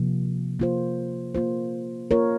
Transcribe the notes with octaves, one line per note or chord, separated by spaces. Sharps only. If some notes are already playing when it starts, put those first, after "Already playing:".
Already playing: C3 F3 A#3
A#3 F4 C5
A#3 F4 C5
A#3 F4 A#4 C#5